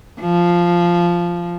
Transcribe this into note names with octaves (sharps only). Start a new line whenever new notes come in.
F3